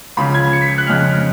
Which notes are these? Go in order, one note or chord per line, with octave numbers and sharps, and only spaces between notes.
C#2 C#3 F3 B5
G#6
C#7
B6
F#6
F2 C#3 G#3 F6